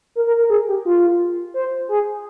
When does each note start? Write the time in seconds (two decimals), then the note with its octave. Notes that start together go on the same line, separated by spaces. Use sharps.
0.16 A#4
0.27 A#4
0.38 A#4
0.50 G#4
0.68 G4
0.85 F4
1.54 C5
1.89 G#4